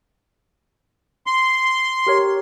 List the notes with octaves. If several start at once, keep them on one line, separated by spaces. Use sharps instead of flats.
C6
G4 A#4 C#5